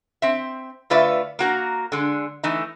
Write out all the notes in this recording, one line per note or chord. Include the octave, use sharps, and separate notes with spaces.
C4 E5
D3 A3 F4 B4 D5 E5
A#3 F#4 A#4
D3 G#3
E3 A3 D#4